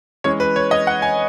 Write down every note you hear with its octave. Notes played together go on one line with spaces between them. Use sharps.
E3 G#3 C#4 C#5
B4
C#5
D#5
F#5
G#5